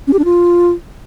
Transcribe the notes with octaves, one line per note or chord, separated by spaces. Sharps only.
C#4
G4
D4
F4